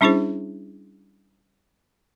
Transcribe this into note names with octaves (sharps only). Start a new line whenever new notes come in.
G3 C#4 D4 E4 G#4 C5